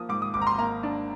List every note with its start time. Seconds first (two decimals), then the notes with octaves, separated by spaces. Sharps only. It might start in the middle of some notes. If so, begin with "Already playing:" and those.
Already playing: F3 A#3 D#6
0.09 G#2 D6
0.22 D#6
0.34 G#1 D6
0.41 A#5
0.47 C6
0.58 A#3 A#5
0.83 D4